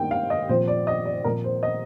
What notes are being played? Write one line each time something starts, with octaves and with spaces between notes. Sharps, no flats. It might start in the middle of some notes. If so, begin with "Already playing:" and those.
Already playing: G2 D#3 A#3 G5
F5
D#5
A#2 F3 C4 C5
D5
D#5
D5
A#2 F3 C4 A#4
C5
D#5